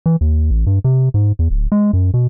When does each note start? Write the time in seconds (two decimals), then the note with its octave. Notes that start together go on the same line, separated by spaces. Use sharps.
0.06 E3
0.21 D#2
0.50 A1
0.67 G2
0.84 C3
1.14 G#2
1.39 E2
1.50 D1
1.72 G#3
1.93 F#2
2.14 B2